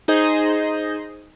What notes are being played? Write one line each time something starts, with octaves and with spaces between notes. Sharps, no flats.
D#4 G#4 C5 D#5